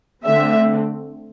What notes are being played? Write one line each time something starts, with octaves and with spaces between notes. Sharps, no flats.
D3 A3 C4 E5